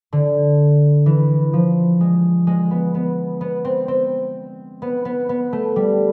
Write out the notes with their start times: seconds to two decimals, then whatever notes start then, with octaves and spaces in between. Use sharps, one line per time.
0.13 D3
1.06 E3
1.53 F3
2.01 G#3
2.47 G#3
2.71 B3
2.94 B3
3.41 B3
3.65 C4
3.88 C4
4.82 B3
5.05 B3
5.29 B3
5.53 A3
5.76 G3